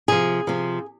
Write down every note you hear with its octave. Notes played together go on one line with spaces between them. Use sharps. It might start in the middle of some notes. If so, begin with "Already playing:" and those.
C3 F3 G#4
C3 F3